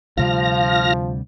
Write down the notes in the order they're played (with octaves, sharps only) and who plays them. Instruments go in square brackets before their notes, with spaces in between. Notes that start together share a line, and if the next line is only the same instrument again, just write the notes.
[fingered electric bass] D2 C3 G3 [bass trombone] F3 [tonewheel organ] F4 F6 A#6